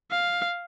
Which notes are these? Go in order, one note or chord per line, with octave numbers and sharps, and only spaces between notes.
F5